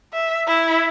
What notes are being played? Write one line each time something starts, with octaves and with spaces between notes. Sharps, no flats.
E5
E4